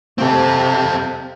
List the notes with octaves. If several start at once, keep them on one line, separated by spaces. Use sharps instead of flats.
C3 C4 A4